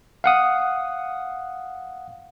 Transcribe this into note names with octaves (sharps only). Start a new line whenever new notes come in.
F5 F#5 D#6